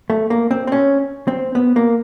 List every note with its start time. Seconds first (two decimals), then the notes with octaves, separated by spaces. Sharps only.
0.10 A3
0.30 A#3
0.51 C4
0.67 C4
0.72 C#4
1.28 C4
1.55 B3
1.76 A#3